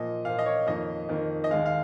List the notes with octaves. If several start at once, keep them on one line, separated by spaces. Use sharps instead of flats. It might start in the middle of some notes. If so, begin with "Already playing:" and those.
Already playing: A#2 F3 A#3 D#5
A#2 F3 A#3 F5
D#5
C#5
F2 D#3 A#3 D#5
F2 D#3 A#3
D#5
D#2 D#3 G#3 F5
F5